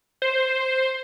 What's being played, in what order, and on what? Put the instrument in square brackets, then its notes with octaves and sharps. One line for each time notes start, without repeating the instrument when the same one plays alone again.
[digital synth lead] C5